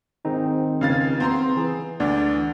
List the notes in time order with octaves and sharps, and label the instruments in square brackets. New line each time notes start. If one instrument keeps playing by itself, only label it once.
[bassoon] G#2 [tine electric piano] D#3 C4 D#4
[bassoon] C#2 [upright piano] C#3 F5 A6
[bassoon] B3 [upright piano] C4 A#5 C6
[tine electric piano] E3 [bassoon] G#4
[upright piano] D2 [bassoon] D4